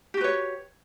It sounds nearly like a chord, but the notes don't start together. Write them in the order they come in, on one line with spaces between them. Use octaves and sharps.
G4 F#4 B4 C#5